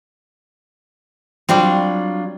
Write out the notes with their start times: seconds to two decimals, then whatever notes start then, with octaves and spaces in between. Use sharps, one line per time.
1.49 F#3 G3 C4 D4 F4